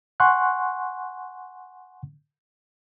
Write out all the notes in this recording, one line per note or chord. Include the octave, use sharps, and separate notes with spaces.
F#5 G#5 C6 C#6 F#6